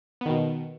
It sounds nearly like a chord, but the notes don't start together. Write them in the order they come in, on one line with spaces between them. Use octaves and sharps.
B3 D#3 B2